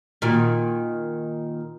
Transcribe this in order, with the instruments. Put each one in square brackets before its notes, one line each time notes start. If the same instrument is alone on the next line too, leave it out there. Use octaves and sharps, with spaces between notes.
[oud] A#2 D#3 F#4